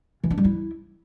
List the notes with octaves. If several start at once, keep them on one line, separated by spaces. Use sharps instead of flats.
E3
D4
G3
E4